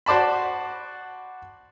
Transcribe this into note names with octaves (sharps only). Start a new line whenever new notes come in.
F#4 C5 D5 A5 B5